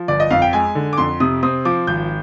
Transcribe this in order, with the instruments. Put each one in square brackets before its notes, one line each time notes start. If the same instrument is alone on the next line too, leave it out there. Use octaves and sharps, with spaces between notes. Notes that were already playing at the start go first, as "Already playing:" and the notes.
Already playing: [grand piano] F3
G1 D5
D#5
F2 F5
G5
G#3 G#5
D3
D6
F2 C6
C3 D#6
C4 D#6
F3 D6
G#1 G6